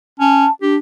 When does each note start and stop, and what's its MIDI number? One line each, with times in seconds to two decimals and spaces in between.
0.20 0.46 61
0.20 0.51 81
0.62 0.78 62
0.62 0.76 67